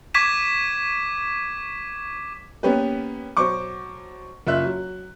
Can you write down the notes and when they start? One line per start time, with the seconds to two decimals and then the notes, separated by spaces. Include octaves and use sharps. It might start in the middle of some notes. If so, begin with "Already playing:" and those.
0.14 C#6 D6 G#6 B6 D#7 E7
2.63 A#3 B3 C#4 G4 B4
3.37 B2 F#3 C5 C#6 D6
4.47 F#1 F4 E5 F#6
4.64 F#3